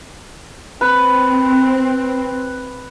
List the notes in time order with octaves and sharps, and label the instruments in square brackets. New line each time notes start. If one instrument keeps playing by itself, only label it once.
[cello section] C4 [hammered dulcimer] B4